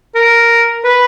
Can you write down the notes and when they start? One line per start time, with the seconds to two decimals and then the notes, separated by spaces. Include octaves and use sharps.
0.15 A#4
0.84 B4